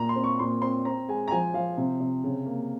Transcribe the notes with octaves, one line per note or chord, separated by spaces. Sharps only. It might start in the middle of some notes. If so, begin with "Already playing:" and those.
Already playing: A#2 A#5
C6
C4
C#6
A#2 C6
C4 C6
C4 A#5
G#3 G#5
A#5
F3 G#5
F3 F5
C3
C3
C#3
A#3